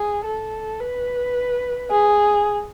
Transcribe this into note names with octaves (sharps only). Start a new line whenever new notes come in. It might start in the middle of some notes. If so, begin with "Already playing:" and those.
Already playing: G#4
A4
B4
G#4